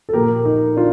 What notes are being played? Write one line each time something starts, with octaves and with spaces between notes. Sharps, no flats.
A4
A#2 F3 A#3 G4 A#4
D#4
D4 F4